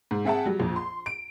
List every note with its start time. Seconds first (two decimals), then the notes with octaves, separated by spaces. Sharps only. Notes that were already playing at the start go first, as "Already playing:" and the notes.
0.11 G#2
0.25 C4 G#4 E5 F#5 G5 A5
0.46 F#3 G3
0.59 A#1 F2
0.76 C6
1.06 D7